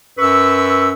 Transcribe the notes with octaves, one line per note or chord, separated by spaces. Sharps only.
F#2 B4 C#6 E6